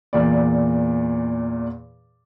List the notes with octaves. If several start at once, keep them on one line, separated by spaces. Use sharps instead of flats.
E2 A#2 D5